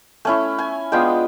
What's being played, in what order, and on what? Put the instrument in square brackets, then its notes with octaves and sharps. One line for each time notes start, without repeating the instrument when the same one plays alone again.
[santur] A3 C#4 E4 G#5
G#5
G#3 B3 D4 F4 G5